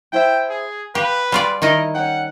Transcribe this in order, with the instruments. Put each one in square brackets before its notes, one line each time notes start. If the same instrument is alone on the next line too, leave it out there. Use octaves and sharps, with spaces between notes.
[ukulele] E4 C5 E5 [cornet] G5
[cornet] G#4
[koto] G4 [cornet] B4 [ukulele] F5 G5
[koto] G3 F4 D5 [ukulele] G#5
[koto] D#3 D#4 D#5 [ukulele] E4 [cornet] A#4
[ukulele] C#4 G5 [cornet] F#5